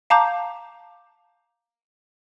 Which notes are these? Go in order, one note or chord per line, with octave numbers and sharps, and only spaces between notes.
F5 A5 A#5 D6 G6